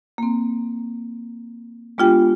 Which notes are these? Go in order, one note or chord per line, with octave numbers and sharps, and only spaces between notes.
A#3 C4
G#3 B3 D4 F4 G4 G5